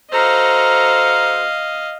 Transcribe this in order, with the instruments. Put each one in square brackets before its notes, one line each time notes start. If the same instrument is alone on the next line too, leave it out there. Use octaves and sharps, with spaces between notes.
[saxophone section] F#4 A4 C5 [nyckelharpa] D#5 F5 [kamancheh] A#5